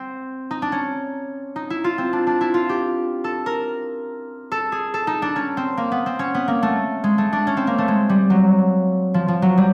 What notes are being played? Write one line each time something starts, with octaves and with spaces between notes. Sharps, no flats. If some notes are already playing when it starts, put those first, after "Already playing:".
Already playing: C4
D#4
D4
C#4
D#4
E4
F4
C4
D4
D4
E4
F4
G4
A4
A#4
A4
G#4
A4
D#4
D4
C#4
C4
A#3
B3
C4
C#4
B3
A#3
A3
G#3
A3
D4
C#4
C4
A#3
A3
G#3
G3
F#3
F3
F3
F#3
G3